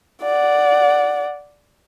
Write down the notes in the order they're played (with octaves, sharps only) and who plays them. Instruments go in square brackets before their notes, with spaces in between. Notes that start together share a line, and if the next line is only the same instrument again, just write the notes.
[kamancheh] D5 F#5